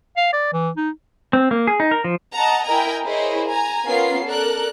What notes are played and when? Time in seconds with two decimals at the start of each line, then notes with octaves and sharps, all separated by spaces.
0.17 F5
0.33 D5
0.53 E3
0.77 D#4
1.33 C4
1.51 A#3
1.67 G#4
1.80 D#4
1.91 A#4
2.04 F3
2.34 D#5 F#5 A5 A#5
2.65 E4 A#4 D#5 G5 G#5 A#5
3.05 E4 G#4 A#4 C5 C#5 D#5
3.47 G#5 A#5
3.86 B3 C#4 F4 A#4 C7
4.26 A4 A#4 D5 F#6